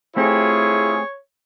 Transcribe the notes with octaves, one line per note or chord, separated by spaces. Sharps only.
A3 C4 E4 F4 G4 G#4 C#5